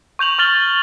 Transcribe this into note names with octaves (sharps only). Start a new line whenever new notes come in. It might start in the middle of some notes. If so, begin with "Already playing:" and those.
C#6 G6 F7 F#7
C#6 F6 A6 F#7 G7